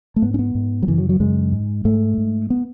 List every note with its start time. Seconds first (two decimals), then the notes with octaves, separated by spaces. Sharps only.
0.16 A3
0.22 G#2 B3
0.34 C#4
0.39 B3
0.55 G#2
0.82 F#3
0.87 F#2 C#3 E3
0.98 F#3
1.09 F#3
1.20 F#2 C#3 G#3
1.52 G#2
1.85 G#2 A3
2.17 G#2
2.50 B3